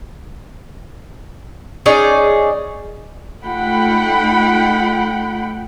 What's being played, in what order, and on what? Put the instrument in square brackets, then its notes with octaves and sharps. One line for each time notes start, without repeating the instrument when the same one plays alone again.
[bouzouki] C#4 D#4 G#4 D5
[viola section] A3 D#4 F4 F#5 G5 B5